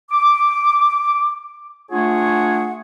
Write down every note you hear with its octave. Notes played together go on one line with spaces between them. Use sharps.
D6
A3 D4 F4 G#4 C#5 F#5